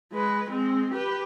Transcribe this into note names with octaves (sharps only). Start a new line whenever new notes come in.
G#3 B4
G#3 C4
G4 B4